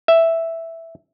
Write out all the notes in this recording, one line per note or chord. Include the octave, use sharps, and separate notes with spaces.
E5